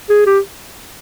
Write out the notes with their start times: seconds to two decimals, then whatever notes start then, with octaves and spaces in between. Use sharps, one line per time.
0.10 G#4
0.26 G4